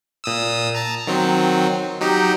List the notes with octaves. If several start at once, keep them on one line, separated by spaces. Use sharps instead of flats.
A#2 D#6 E6
A5 A#5
D#3 F#3 C4
F#3 D#4 G4